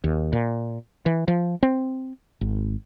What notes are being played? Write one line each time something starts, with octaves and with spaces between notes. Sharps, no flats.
D#2
A#2
E3
F3
C4
G#1